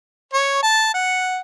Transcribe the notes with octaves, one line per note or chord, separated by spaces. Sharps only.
C#5
A5
F#5